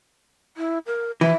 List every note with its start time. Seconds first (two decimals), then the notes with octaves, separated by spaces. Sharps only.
0.57 E4
0.86 A#4
1.21 E3 E5